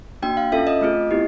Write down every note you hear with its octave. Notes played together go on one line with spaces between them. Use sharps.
A#3 D4 F#4 G5
F5
C#4 F4 A4 E5
D#5
A3 C4 F4 G#4
B3 E4 G4